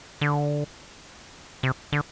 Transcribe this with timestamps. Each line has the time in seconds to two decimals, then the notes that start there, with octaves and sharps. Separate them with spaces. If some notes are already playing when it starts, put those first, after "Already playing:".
0.21 D3
1.63 C3
1.92 D3